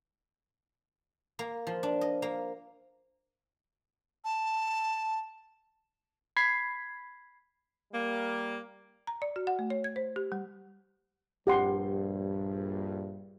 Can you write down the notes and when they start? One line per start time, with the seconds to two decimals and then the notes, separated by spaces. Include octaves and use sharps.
1.39 A#3
1.67 F3
1.83 D4
2.01 D#5
2.22 A#3
4.24 A5
6.37 B5 G#6 B6 C7
7.93 G3 A#3
9.07 A#5
9.22 D5
9.36 F#4
9.47 F#5
9.59 A3
9.70 C#5
9.84 G#6
9.96 C5
10.16 G4
10.32 G3
11.47 A#1 G2 G4 F#5 C6